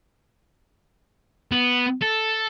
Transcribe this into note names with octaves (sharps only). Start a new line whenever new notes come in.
B3
A4